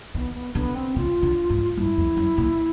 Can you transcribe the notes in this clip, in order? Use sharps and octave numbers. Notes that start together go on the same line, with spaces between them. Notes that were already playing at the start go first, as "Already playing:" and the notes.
D#3 B3
B3
D3 B3
C4
C#3 F4
D3
G#2
G2 E4
F2
F#2
A#2